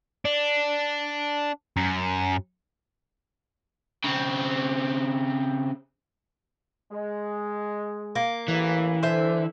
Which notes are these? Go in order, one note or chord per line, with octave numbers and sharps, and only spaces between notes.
D4
F#2
C#3 C4
G#3
A#3
A1 E3
D3 A4 C5 E5